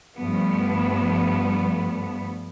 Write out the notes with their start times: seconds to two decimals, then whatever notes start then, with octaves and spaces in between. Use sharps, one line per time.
0.17 G2 F3 G3 A3 B3